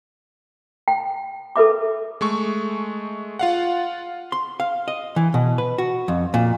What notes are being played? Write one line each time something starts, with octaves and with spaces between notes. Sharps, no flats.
G5
A4 B4 E5 D6
G#3 A3 C#6
F4 F5 F#5
C6
F5
D#5
E3
B2
B4
F#4
F2
A#2